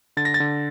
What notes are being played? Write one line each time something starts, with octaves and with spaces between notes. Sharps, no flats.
D3 A6
A#6
A6
D3